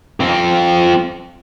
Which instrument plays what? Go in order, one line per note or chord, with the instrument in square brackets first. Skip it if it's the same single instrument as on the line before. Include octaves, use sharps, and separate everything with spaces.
[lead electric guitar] F2 C4